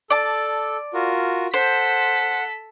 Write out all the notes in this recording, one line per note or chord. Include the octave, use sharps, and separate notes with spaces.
A4 D5 A5
F4 F#4 A#4
A4 C5 F#5 B6